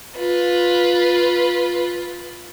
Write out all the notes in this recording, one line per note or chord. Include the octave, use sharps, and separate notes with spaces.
F4 B4